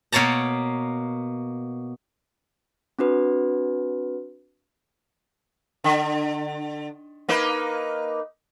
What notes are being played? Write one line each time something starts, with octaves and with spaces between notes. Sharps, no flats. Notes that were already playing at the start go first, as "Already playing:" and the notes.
B2 A#3 C#5 A5 A#5
C4 D4 F#4 B4
D3
A#3 D#4 B4